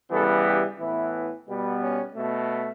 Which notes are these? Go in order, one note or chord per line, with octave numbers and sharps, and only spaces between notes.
C#3 E3 G3 B3 A4
G4
A2 E3 B3 E4
B2 G3 B3
C#4
B2 A3